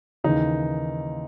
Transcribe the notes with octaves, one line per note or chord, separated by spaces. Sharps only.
D#2 C#3 E3 D#4